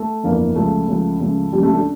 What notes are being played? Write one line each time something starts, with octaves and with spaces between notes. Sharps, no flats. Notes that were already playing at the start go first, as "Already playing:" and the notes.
Already playing: A3
G1 F2 E3 A#3
C#2 C#3 F3 A3
C#2 C#3 F3
C#2 C#3 F3
C#2 C#3 F3 G3
A3
D4